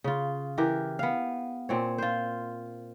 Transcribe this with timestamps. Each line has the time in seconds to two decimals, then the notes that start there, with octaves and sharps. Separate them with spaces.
0.04 C#3 F4
0.58 E3 G4 A#4
0.99 B3 F5
1.69 A#2 C4 C#5
1.98 F4 C5